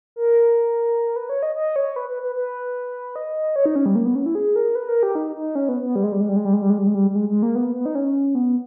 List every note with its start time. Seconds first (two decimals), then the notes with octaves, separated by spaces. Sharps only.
0.16 A#4
1.16 B4
1.29 C#5
1.43 D#5
1.56 D#5
1.76 C#5
1.96 B4
2.10 B4
2.23 B4
2.36 B4
3.16 D#5
3.56 C#5
3.66 D#4
3.76 C#4
3.86 G3
3.95 A#3
4.05 B3
4.15 C#4
4.26 E4
4.35 G#4
4.56 A#4
4.75 B4
4.88 A#4
5.03 G4
5.15 D#4
5.36 D#4
5.55 C#4
5.69 B3
5.82 B3
5.96 G3
6.03 G#3
6.12 G3
6.20 G#3
6.29 G3
6.36 G#3
6.45 G3
6.53 G#3
6.62 G3
6.70 G#3
6.78 G3
6.87 G#3
6.95 G3
7.11 G3
7.15 G#3
7.29 G#3
7.43 A#3
7.55 B3
7.75 B3
7.86 D#4
7.95 C#4
8.35 B3